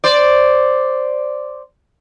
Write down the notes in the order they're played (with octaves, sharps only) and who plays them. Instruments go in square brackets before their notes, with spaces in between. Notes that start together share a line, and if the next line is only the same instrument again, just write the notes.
[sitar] C5 D5